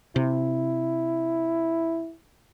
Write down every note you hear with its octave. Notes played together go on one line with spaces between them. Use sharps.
C3 E4